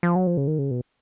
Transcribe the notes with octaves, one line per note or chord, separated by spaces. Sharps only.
F3
F#3
F3
C#3
D#3
C#3
B2